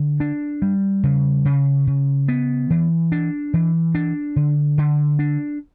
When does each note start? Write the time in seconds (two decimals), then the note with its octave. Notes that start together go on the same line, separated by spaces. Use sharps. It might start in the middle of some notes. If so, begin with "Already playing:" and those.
Already playing: D3
0.20 D4
0.62 G3
1.03 C#3
1.45 C#3
1.87 C#3
2.28 B3
2.70 E3
3.12 D4
3.54 E3
3.95 D4
4.36 D3
4.78 D3
5.19 D4